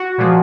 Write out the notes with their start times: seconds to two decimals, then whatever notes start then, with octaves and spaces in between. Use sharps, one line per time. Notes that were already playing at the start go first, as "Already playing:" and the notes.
Already playing: F#4
0.18 A#2 F3 G#3